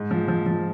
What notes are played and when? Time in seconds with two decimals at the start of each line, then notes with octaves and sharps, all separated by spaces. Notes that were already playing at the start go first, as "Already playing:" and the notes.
Already playing: G#2
0.11 F3
0.28 F3
0.46 F3